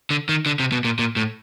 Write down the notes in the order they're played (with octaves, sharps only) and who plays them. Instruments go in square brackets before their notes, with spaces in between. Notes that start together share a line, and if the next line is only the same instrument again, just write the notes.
[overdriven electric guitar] D3
D#3
D3
C3
B2
A#2
A#2
A2